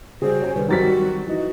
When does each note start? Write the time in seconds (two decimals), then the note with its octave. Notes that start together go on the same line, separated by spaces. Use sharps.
0.22 C#3 G3 F#4 G#4 C5
0.41 C#5 G#5
0.56 C2 D3 G3 B4
0.69 D#3 F#3 G3 C4 F#4 A6 B6
1.27 E3 D#4 F#4